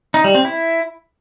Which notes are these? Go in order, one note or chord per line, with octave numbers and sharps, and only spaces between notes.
D#4
G3
C4
E4